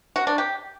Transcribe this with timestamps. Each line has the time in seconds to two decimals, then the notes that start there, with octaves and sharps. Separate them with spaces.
0.16 F#4
0.27 D4
0.38 G4